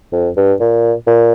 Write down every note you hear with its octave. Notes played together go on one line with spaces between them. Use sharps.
F2
G2
A#2
A#2